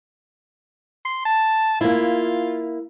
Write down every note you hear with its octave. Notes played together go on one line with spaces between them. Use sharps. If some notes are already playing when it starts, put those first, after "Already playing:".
C6
A5
A#3 E4 F4